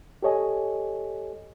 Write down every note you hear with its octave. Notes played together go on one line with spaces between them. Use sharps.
G4 A4 C#5 D#5 G#5